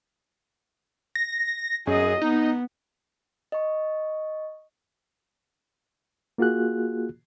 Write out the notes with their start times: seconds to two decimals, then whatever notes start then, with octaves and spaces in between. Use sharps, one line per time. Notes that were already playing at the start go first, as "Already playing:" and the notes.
1.15 A#6
1.87 F#2 G#4 D#5
2.22 B3 D#4
3.52 D#5 C#6
6.38 A#3 F4 F#4 G#4 F#6